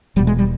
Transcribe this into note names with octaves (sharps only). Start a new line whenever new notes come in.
E1 E2 B2 G3
G#3
G3